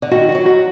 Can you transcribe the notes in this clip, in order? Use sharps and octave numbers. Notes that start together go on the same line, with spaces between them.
D3
D#3 F#4
F#4
F#3
F#4